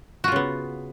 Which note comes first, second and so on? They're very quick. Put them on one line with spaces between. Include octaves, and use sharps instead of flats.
F#4 F4 C#3 B3